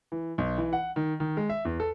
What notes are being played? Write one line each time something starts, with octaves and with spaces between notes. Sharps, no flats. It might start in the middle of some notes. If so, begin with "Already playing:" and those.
E3
B1
E3
F#5
D#3
D#3
G#3
E5
E2
A4